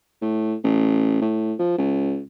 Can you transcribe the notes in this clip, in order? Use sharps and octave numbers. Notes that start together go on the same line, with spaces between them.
A2
A1
A2
F3
C#2